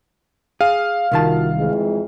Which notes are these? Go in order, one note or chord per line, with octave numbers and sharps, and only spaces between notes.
G#4 F5
C2 D#3 F4 F#4 A#4 A5
F2 E3 G#3